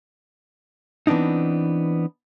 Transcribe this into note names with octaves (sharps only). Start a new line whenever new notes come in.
E3 B3 C4 D4 D#4